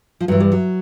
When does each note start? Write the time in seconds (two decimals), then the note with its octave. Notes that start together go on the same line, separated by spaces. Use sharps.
0.21 F3
0.28 G2 E3 F#3
0.40 G3
0.52 F#3